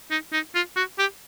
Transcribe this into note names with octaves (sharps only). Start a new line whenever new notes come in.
D#4
D#4
F4
F#4
G4